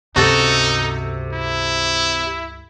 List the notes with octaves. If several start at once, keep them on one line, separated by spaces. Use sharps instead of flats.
C#2 G2 C3 D#4 F#4 A4
E4